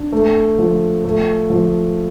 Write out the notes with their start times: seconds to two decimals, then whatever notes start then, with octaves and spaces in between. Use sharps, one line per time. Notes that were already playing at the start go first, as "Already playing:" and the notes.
Already playing: D4
0.12 A3
0.58 F3
1.05 A3
1.50 F3